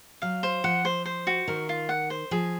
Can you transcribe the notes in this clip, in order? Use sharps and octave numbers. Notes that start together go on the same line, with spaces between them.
F#3 F5
C5
F3 F#5
C5
C5
F#4
D#3 A#4
F4
F#5
C5
F3 G#4